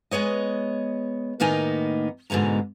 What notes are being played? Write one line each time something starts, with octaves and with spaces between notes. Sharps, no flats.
G#3 B3 C#5 D#5
A2 D#3 A#3 B3 D#4 G#5
G#2 B2 D3 G#3 A#5